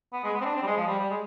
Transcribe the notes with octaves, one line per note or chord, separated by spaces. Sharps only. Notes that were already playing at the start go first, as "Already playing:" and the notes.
B3
G#3
B3
C4
D4
C4
G3
G#3
F3
G3
G3
G#3